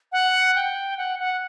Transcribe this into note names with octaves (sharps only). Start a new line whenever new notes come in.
F#5
G5
F#5
F#5